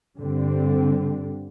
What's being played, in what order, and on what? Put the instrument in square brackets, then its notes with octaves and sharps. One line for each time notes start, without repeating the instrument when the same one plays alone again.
[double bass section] G2 D3 G3 C4